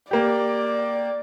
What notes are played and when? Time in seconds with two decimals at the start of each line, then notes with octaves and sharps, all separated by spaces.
0.11 A#3 G4 D5